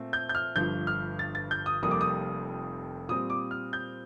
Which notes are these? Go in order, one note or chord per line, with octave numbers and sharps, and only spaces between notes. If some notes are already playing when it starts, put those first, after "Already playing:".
Already playing: A#2 A3 C4
G6
G6
F6
G1 G2 F3 G6
F6
A6
A6
G6
D#6
F1 F2 C3 G3 A#3 D#6
D6
D#6
A#2 G3 C4 D#6
D6
F6
G6